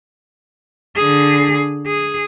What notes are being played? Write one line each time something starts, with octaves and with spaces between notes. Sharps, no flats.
D3 G#4
G#4